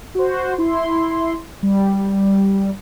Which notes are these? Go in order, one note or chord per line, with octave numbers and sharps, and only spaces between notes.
F#4 C5
E4 C6
G3